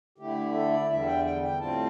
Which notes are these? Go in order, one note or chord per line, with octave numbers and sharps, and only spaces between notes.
D3 A3 E4 G4
A4
D5
E2 D3 G3 E5
G5
G5
G5
A2 G3 C4 F4 A5